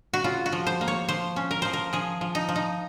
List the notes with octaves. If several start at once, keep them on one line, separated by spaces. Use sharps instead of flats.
F#4
C#3 F4
F#4
F3
C5
A#3
C#5
F3 C5
C#4
A#4
F3 C5
A#4
F3 G#4
F3
D#4
F3
D#4